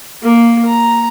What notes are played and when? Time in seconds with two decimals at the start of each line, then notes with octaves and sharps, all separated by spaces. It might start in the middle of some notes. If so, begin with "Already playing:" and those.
0.22 A#3 A#4
0.65 A#5